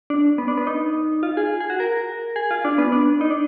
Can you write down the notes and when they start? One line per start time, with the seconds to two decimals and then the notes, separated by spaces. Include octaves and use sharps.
0.10 D4
0.38 B3
0.48 D4
0.57 B3
0.67 D#4
1.23 F4
1.37 G#4
1.60 G#4
1.70 F#4
1.80 A#4
2.36 G#4
2.51 F4
2.65 D4
2.78 B3
2.92 D4
3.21 D#4
3.30 D4